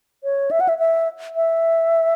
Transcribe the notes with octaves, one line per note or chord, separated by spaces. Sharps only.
C#5
E5
F#5
E5
E5
E5